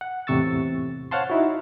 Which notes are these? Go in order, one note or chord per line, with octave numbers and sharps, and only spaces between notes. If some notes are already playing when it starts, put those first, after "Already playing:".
F#5
E2 A2 C3 C#6 E6 A6
C5 C#5 F5 F#5 A5 C6
D#4 E4 F#4